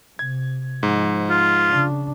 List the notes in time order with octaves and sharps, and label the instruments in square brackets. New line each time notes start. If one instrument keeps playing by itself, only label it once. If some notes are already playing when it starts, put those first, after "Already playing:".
[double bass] C3 [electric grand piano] G#6
[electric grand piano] G#2 [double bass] F3
[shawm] F4
[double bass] C#3 D4